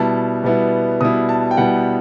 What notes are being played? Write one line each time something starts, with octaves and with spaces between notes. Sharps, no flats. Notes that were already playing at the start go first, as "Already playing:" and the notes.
Already playing: B2 G3 B3 E4 A5
B2 G3 B3 E4
B2 G3 B3 E4 D#6
A5
G5
B2 G3 B3 E4 F#5